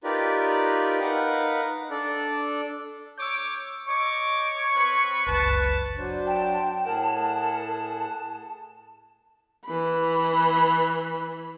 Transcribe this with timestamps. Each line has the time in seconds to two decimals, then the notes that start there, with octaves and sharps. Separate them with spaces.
0.04 D#4 F4 G4 A#4 B4 D5
1.01 D#4 A#4 B4 F5 F#5
1.91 D4 A4 D5
3.18 C#5 D6 E6 G6
3.88 C#5 D#5 C#6 D6
4.73 C4 B4
5.27 G1 C#2 F#2 B4 A5
5.97 F#3 D4 C5
6.26 G5 A5
6.85 A2 G#4 A#4 F#5
9.65 E3 B5